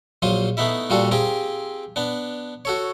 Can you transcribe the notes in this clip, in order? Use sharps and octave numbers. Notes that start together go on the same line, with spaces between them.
A#1 F#3 F4 C5 D#6
A3 B3 D#4 E4 E5
A#2 G3 F4 F#4 A4
C4 F4 G4 G#4 A#4
B3 D4
F#4 A4 C#5